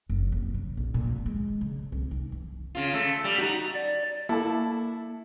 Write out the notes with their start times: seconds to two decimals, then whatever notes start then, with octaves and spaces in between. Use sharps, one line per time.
0.10 F#1
0.32 F2
0.54 C#3
0.77 A#1
0.94 A#2
1.10 G#1
1.26 G#3
1.61 C#3
1.92 C2
2.11 D#4
2.32 E3
2.75 C#3 F4
2.94 A3
3.24 G3
3.38 D#4 F#4
3.74 D5
4.29 A#3 E4 A4 A5